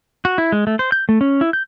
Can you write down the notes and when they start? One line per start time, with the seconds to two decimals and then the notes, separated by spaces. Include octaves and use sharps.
0.25 F#4
0.38 E4
0.52 G#3
0.67 A3
0.79 C5
0.92 G6
1.09 A3
1.21 C#4
1.41 E4
1.53 G6